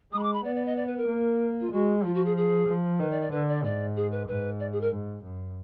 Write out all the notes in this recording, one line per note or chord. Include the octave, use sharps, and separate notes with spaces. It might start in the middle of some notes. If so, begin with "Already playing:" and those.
G#3 D#6
B5
D6
B5
B3 D5
D5
D#5
D5
B4
A#4
A#3
F4
G#3 F#4
F3 F4
F#4
G#4
G#4
F3
D#3 B4
D5
D5
D3 B4
D5
G#2 D5
G#4
B4
G#2 B4
D5
G#4
A#4
G#2
F#2